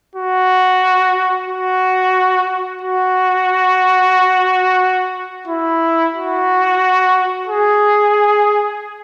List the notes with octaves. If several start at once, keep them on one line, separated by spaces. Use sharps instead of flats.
F#4
F#4
F#4
E4
F#4
G#4